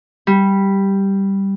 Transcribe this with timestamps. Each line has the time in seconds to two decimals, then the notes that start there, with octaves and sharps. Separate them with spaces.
0.27 G3